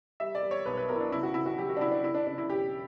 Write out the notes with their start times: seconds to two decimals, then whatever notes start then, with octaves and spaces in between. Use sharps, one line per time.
0.20 G3 E5
0.35 D5
0.42 G3
0.51 C#5
0.66 B1 B4
0.77 B4
0.89 B2 A#4
0.95 E4
1.00 D4
1.12 C#3 E4
1.23 F#4
1.34 C#3 E4
1.46 F#4
1.58 F#3 G4
1.69 F#4
1.77 D4
1.81 C#3 E4
1.91 D4
2.03 C#3 E4
2.14 D4
2.27 C#3 D4
2.38 E4
2.49 E1 G4